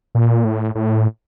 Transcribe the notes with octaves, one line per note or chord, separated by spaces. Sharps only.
A#2
A2
A2